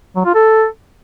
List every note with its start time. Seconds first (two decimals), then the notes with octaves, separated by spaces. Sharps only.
0.16 F#3
0.25 F4
0.35 A4